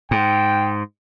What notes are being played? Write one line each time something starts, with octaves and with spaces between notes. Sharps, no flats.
G#2 G5